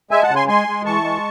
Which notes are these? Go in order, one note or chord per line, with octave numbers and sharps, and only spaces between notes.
G#3 E5 G#5
F#5 A5
C#3
G#5 C6
G#3 G#5 C6
G#3
E3 A5 C#6
G#3